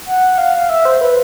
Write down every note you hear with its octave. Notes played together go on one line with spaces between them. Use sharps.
F#5
F5
E5
C5
B4